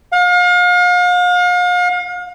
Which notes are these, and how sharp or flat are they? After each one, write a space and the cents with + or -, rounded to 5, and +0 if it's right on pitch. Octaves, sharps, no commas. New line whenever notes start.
F5 +40